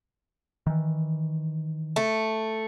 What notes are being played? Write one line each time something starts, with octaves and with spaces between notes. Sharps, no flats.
D#3 E3
A3